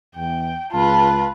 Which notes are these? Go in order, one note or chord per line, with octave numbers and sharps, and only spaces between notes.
E2 G5
C#2 F4 B4 A5